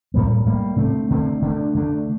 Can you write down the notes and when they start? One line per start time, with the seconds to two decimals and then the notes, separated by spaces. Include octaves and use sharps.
0.14 A2 G3 A#3
0.46 A2 G3 A#3
0.78 D3 A3 C4
1.10 D3 A3 C4
1.42 D3 A3 D4
1.75 D3 A3 D4